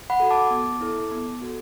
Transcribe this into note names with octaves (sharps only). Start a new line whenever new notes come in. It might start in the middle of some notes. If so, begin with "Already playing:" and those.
F#5 B5
F#4 A4
A5 D6
B3
E4 A4
B3
F#4 A4